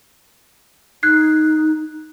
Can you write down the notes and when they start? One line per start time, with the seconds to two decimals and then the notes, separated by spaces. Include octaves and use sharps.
1.03 D#4 F#6 G#6 C7